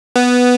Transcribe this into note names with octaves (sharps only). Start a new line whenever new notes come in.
B3